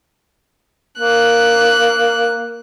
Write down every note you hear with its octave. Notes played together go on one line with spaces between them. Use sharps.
A#3 F#6